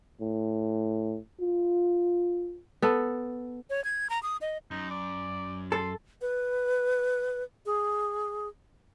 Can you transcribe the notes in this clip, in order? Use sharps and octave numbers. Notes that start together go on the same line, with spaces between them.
A2
F4
B3 A4
C#5
G#6
A#5
D#6
D#5
F#2 D#4
D5
A4 C6
B4
G#4